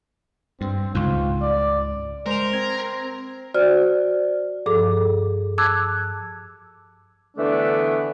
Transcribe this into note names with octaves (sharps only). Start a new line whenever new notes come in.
G2 C4
C#2 G#2 F4
D5
G#3 A#4 C5 F7
C4 G#6
F#4 C5 D5 F6
G2 F3 G#4 A4 D6
A5 D6 E6 F#6 G#6
D3 E3 A3 B3 D4